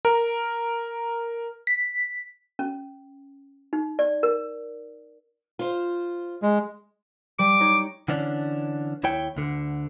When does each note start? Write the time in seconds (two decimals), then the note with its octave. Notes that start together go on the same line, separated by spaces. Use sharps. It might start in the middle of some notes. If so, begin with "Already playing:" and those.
0.05 A#4
1.67 B6
2.59 C#4
3.73 D#4
3.99 D5
4.23 A#4
5.59 F4 C5
6.43 G#3
7.39 G3 D6
7.60 D#4 C#5
8.08 D3 E3 C#4 D4
9.03 D#2 E4 C#5 G5
9.37 D2 D3